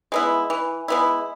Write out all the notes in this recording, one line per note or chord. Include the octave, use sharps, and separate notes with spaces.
G#3 B3 E4
E3
G#3 B3 E4